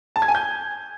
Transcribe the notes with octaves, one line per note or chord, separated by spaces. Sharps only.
A5
G#6
G#5
G6